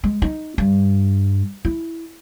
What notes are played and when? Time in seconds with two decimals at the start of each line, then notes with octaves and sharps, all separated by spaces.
0.04 G#3
0.22 D#4
0.58 G2
1.65 E4